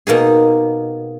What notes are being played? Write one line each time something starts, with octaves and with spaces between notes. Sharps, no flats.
B2 A#3 D#4 G#4